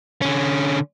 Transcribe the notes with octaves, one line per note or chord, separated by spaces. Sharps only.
D3 C#4